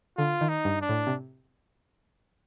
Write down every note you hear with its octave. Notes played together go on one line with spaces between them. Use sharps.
D3 F4
D#3
D#4
G2
D4
A2
C3